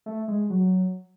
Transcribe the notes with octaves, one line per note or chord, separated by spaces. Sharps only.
A3
G#3
F#3